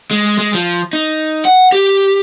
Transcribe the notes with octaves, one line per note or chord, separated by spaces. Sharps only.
G#3
G#3
F3
D#4
F#5
G4